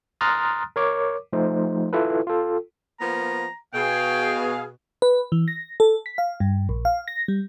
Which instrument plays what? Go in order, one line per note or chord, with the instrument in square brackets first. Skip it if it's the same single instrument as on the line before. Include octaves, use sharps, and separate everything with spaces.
[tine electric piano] A#5 C6 D#6 F6 F#6 A6
A#4 C#5 D6
F3 A3 D#4 C5
E4 F4 A4 B4
F4 A4
[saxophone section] F3 A#3 B3 [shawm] A#5
[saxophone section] B2 [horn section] G#4 F5 [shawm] G5
[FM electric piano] B4
E3
A#6
A4
B6
F5
G2
A#1
F5
A#6
G3